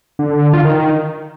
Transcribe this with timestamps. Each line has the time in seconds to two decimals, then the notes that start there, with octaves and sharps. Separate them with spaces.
0.19 D3
0.30 D3
0.42 D3
0.53 F4
0.65 D#3